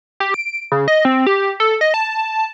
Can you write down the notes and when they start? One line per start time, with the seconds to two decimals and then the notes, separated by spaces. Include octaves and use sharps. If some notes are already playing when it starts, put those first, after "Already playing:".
0.20 G4
0.34 D7
0.72 C#3
0.88 D#5
1.05 C4
1.27 G4
1.60 A4
1.81 D#5
1.94 A5